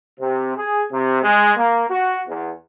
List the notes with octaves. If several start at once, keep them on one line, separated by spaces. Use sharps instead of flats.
C3
G#4
C3
G#3
A#3
F#4
E2